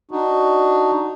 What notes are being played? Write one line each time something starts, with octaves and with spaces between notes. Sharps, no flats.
D4 D#4 F#4